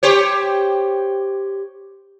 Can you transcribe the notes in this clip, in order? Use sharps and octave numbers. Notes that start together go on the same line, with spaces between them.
G4 C5 C#5